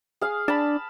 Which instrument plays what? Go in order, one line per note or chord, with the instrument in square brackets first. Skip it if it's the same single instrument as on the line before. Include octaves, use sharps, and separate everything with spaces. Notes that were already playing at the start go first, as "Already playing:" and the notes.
[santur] G#4 F5
[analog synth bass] D4 [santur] A5 B5